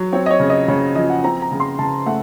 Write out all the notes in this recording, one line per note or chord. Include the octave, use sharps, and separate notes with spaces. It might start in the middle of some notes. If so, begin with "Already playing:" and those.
Already playing: F#3
C4 C#5
D#5
C#5
C#3
D#5
C#3 C#5
F3 D#5
F#5
C4 A#5
A#5
C#3
C6
C#3 A5
A3 F#5